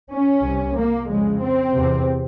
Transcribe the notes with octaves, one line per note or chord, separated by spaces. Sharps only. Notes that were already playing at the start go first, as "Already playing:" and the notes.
C#4
C2 C3
A#3
F2 C#3 G#3
C4
E2 C3